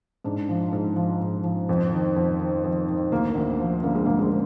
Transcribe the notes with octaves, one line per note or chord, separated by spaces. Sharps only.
G#2 D4
F3
G#2
F3
G#2
F3
F2
D#3
F2
D#3
F2
D#3
D2 A#3
D2
F3
D3 A#3
G#3
D2 A#3
G#3